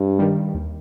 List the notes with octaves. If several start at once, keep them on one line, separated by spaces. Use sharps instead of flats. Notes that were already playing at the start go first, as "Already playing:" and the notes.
Already playing: G2
D#3 G3
D#2